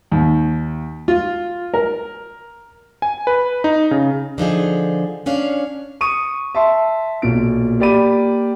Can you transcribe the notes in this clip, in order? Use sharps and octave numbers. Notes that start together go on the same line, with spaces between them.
D#2
F4
A#4
G#5
B4
D#4
C#3
D3 F3 D#4 G#4
C#4 D4 C#5 F5
C#6 D#6 D#7
E5 A5 C6
B1 A#2 D7
A#3 G4 D5 B5 D#7